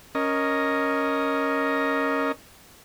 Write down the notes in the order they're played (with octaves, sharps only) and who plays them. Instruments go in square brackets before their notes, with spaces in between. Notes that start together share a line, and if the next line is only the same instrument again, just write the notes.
[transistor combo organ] C#4 A#4 D#5